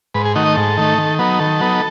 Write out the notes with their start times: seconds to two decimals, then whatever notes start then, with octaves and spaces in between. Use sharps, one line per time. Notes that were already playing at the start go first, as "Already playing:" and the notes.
0.14 G#2 B4
0.25 G#4
0.35 D#3 A3 D#4 F#4
0.46 D#5
0.56 G#2 A4
0.77 D#3 A3 D#4
0.98 D#3
1.19 F#3 B3 D#4
1.39 D#3 A4
1.60 F#3 B3 D#4